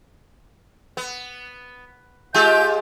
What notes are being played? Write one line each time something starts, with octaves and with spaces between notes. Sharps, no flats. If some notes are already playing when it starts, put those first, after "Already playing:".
B3
G#3 F4 G4 G6